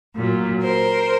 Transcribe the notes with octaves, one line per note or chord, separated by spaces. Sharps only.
A#2 F#3
A#4 C5